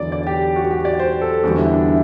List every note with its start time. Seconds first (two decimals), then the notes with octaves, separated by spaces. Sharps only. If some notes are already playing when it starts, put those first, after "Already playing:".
Already playing: E2 D3 F#3 D5
0.12 D5
0.27 G4
0.56 F#4
0.71 G4
0.85 D5
0.99 C5
1.21 A4
1.44 E2 D3 G3 F#4
1.58 E4
1.73 D4
1.88 E4